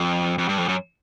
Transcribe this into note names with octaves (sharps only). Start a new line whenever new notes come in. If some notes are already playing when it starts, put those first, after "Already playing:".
Already playing: F2
F2
G2
F2
F#2